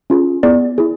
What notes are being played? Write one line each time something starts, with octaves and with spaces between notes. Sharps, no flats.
C#4 F4 G#4
B3 E4 G#4 D5
E4 G#4